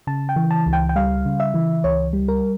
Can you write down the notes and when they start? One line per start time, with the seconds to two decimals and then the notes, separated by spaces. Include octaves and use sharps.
0.07 C#3 A5
0.29 G5
0.36 E3
0.51 A5
0.66 C#2
0.73 G5
0.89 G5
0.96 G3 F5
1.26 C#3
1.40 E5
1.54 E3
1.84 C#2 C#5
2.13 G3
2.28 A#4